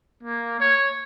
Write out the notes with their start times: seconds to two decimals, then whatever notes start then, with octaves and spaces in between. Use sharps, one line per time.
0.23 A#3
0.60 C#5